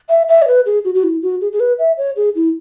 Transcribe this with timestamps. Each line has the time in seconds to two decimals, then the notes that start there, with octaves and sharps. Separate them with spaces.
0.09 E5
0.28 E5
0.42 C#5
0.47 B4
0.66 G#4
0.85 F#4
0.95 F#4
1.04 E4
1.22 F#4
1.41 G#4
1.52 G#4
1.60 B4
1.79 E5
1.98 C#5
2.16 G#4
2.35 E4